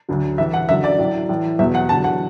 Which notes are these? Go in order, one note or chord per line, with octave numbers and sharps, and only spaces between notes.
D2 D3 F#3
A2 E3 E5
F#5
F#2 D3 F#3 E5
D5
A2 F#3
A2 E3
E2 B2 F#3 E5
F#5
E2 D3 F#3 A5
F#5